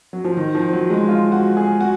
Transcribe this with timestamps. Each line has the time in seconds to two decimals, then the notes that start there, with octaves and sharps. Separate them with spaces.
0.13 F#3
0.24 F3
0.37 D#3
0.55 F3
0.73 F#3
0.90 G#3
1.09 F4
1.32 F#4
1.57 G#4
1.80 F#4